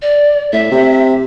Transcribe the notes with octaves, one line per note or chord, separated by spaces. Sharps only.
D5
A2 E5
C3